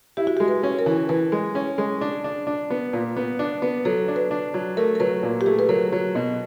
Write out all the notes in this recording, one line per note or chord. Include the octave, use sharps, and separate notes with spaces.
E4 G4
F#4
G4
G#3
B4
C#4
A#4
E3
E3 B4
G#3
C#4
G#3
D4
D4
D4
B3
A#2
B3
D4
B3
F#3 A4
D4
B4
D4
F#3
A3 A#4
A#4
F#3 B4
A#2
G4
A3 G#4
B4
F#3 A#4
F#3
B2